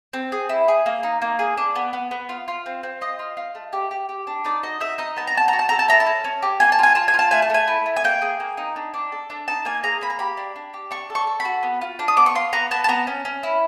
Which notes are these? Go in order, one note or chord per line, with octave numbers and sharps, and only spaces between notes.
C4
G#4
E4
G#4
A#3
D#4
A#3
G#4
D4
B3
B3
B3
F4
F4
C4
C4
F4 D#5
F4
F4
A3
G4
G4
G4
D4
D#4 D5
F#4 D#5
D#4 E5
D#4 D#5
B3 A5
A#5
F#4 A5
F#4 A#5
A5
A4 A#5
A5
E4 A#5
A5
C#4
C#4
G4
A#3 G#5
A5
F4 G#5
F4 A5
G#5
F4
A5
A3 G#5
A5
A3 G#5
E4
A3
G#5
A#3 G5
G#4
A#3
D#4
D4
D4
A4
D4
D#4 A5
A#3 G#5
G#4 A#5
A#3 B5
A#5
G4 B5
D4
D4
G4
D4 C#6
A4
C#6
A4
B5
F#4
B3
F4
D4
D#6
B3 D6
C#6
F4 C6
B3 A#5
B3 A5
A5
B3 A#5
C#4
C#4
E4